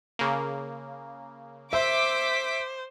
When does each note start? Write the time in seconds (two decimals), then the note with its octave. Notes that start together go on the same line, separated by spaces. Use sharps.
0.19 C#3 A#3
1.73 C5 E5 D6 B6